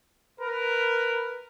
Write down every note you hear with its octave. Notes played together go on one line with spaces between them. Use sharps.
A#4 B4